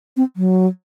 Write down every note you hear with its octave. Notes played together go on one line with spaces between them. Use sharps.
C4
F#3